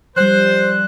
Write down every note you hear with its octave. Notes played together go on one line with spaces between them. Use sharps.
F3 G3 C5 F#6